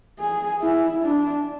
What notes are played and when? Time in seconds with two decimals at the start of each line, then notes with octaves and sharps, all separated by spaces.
0.19 G#4
0.61 E4
1.02 D4